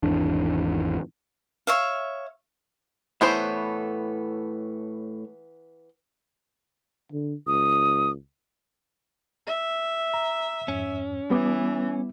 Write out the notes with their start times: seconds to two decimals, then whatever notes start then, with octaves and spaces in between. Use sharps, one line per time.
0.03 G#1 E2 D4
1.67 C#5 E5 F5
3.21 A2 E3 B3 A4 C5 C#5
7.12 D3
7.47 C#2 D#6
9.47 E5
10.14 A#5
10.68 F2 G#2 C#4
11.30 E3 G3 B3 D6